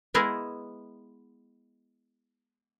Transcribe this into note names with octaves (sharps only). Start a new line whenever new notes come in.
G#3 B3 E4 G#4 A#4